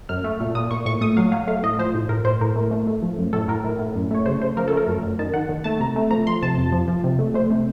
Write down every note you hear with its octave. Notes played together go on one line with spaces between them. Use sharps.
F#2 F6
A3
A#2
A#2 D#6
A#2 C#6
A2 C#6
A3 D#6
F#3 F5
F#3 F5
A3 F5
A2 D#5
F3 C5
A2
A2 A#4
A2 C5
A2 A#4
A3
A3
A3
F3
F#2
A2 A4
A2 A#4
A2
A2
F#2
A3 C#5
C#3 C5
C#3 C5
F3 A#4
A4
A3 A#4
F#2
F#2
D#3 A5
D#3 F#5
D#3
A3 A5
C3 A#5
A3
F3 A#5
F3 C6
C3 A5
F2
F3
F3
C3
A3
A3 C5
C3